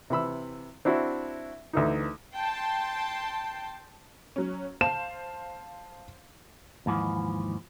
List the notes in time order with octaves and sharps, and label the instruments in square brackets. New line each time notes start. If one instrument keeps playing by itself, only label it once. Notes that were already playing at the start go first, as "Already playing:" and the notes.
[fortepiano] C3 E3 B5 E6
C4 D4 E4 F#4
D2 E3 D#4
[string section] G5 A5 C6
[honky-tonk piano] F#3 C#4
[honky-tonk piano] C5 F5 [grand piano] A5 E7
[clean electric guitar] D#2 G#2 E3 F3